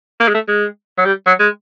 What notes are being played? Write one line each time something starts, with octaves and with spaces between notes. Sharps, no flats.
A#3
G#3
A3
G#3
F#3
G3
F#3
G#3